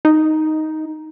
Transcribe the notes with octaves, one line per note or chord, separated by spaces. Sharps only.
D#4